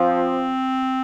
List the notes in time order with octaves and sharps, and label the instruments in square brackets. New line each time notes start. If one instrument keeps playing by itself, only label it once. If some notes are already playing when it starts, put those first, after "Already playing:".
Already playing: [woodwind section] F3 [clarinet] C4